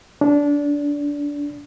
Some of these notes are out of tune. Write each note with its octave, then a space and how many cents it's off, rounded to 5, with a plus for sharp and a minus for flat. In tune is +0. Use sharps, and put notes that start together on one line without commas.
D4 -20